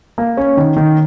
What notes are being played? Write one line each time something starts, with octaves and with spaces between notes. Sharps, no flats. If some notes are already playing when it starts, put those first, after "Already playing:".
A#3
C#4
D#3
D#3